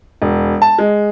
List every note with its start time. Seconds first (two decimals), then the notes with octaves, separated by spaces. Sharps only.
0.22 E1
0.62 A5
0.79 G#3